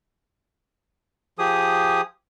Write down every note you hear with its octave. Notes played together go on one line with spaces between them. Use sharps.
F3 G4 G#4 D#6